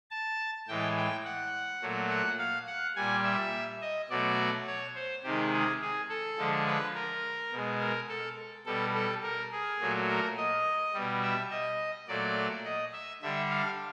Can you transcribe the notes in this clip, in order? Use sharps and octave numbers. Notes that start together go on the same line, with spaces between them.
A5
A2 E3 G#3 G5
G5
F#5
A#2 F#3 A3
F#5
F5
F#5
A#2 G3 G#5
E5
D#5
B2 F#3 A3 D5
C#5
C5
C3 D#3 G#3 G4
G#4
G#4
A4
D3 F3 G#3
B4
A#4
B2 G#3
A#4
A4
B2 G3 A4
A4
A#4
G#4
A#2 F#3 A3
A#4
D#5
B2 G3
E5
D#5
A#2 F#3 A3 D5
D#5
E5
D3 G3 E5
F5